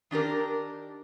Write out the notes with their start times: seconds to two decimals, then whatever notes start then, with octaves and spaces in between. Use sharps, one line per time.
0.11 D#3 D4 G4 A#4